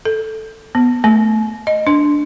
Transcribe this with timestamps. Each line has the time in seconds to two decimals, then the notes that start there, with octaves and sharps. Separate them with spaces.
0.05 A4
0.75 B3
1.04 A3
1.67 D#5
1.87 D4